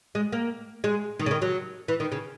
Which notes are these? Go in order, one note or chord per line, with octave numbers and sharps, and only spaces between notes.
G#3
A#3
G#3
D#3
C#3
D#3
F#3
E3
D#3
C#3